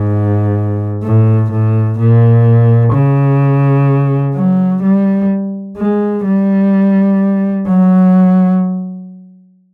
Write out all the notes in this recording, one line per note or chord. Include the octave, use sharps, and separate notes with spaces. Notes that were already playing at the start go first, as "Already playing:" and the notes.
Already playing: G#2
A2
A2
A#2
C#3
F#3
G3
G#3
G3
F#3